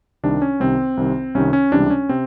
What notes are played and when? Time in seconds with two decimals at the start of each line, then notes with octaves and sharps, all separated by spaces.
0.23 C2 C3 D#3 D4
0.42 C#4
0.60 C2 C3 D#3 C4
0.97 C2 C3 D#3
1.35 C2 C3 D#3 C#4
1.53 C#4
1.72 C#2 C3 E3 G3 D4
1.90 C#4
2.09 C3 C4